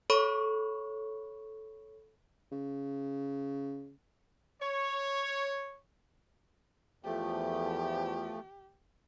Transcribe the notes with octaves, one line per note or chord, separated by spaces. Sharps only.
A4 C#5 B5 C#6
C#3
C#5
E2 F3 A3 G4